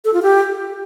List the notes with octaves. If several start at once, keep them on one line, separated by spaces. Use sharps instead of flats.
A4
F4
G4